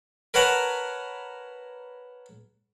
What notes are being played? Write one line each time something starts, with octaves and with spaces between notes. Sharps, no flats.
A#4 B4 C#5 F#5 A5 A#5